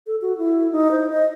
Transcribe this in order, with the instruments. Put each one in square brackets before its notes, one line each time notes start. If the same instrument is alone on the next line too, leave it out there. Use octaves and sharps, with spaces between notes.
[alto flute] A4
F#4
E4
D#4
C5
D#5